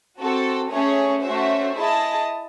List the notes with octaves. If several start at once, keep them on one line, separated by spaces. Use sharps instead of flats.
C4 F#4 A4
A3 C#4 G#4 C#5
A3 C#4 F#4 C5 E5
E4 G#4 D#5 A5